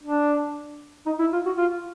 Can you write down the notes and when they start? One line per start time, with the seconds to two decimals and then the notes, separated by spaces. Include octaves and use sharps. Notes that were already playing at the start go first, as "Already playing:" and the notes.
0.03 D4
1.06 D#4
1.19 E4
1.33 F4
1.46 F#4
1.57 F4